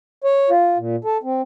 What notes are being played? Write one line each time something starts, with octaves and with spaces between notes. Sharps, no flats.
C#5
F4
A#2
A4
C4